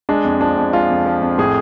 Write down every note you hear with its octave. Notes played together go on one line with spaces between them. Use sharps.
G#3 D4
F2
F3 D4
F2
G#3 F4
F2
F3
F2
A2 G#4